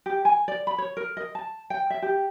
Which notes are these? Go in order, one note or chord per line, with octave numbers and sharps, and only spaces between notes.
G4
G#5
D5
B5
C#5
A#4
D#5
A5
G5
E5
G4